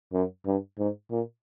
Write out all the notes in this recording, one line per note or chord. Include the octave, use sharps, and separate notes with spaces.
F#2
G2
G#2
A#2